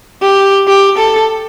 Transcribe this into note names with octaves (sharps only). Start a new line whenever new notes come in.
G4
G4
A4